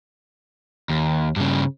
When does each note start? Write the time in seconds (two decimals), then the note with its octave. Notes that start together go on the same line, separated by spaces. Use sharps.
0.89 D#2
1.36 G2 C#3